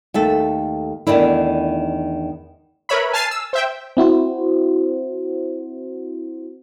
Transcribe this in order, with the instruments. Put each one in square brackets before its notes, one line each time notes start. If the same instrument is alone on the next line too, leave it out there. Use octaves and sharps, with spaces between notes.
[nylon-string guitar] D#2 A3 A4
E2 G#2 D#3 A3 D4 E4
[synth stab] A#4 B4 C#5 E5 B5
G#5 A5 F6 A6 C7 D#7
E6
C5 E5 G5
[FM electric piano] C4 E4 F#4 C5